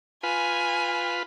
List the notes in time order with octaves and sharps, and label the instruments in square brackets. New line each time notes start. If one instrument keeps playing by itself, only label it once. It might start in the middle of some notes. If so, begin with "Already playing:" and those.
[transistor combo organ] F4 B4 [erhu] G#5